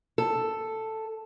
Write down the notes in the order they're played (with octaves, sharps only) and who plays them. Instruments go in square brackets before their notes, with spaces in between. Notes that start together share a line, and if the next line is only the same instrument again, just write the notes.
[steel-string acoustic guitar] A4